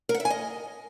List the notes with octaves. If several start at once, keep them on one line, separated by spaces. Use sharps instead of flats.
A#4
F#5
E5
G#5
D#5